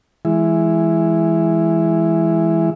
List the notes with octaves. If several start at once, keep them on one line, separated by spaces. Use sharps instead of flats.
E3 G#3 E4